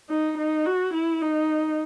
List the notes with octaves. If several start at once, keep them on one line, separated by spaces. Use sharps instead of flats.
D#4
D#4
F#4
E4
D#4